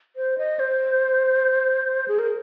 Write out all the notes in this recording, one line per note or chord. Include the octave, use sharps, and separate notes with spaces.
C5
D#5
C5
G#4
A#4